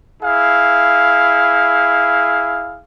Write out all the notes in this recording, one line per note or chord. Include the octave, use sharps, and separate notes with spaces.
E4 G#4 F5